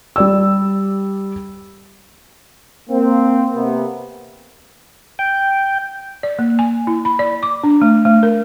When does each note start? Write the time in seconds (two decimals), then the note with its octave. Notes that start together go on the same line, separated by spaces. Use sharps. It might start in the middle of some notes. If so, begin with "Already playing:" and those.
0.16 G3 D5 E6
2.89 A#3 C4
3.53 C3 A#3 B3
5.19 G5
6.23 D5
6.39 A#3
6.59 G#5
6.87 E4
7.05 B5
7.19 D5
7.43 D6
7.64 D4
7.82 A3
8.05 A3
8.23 A#4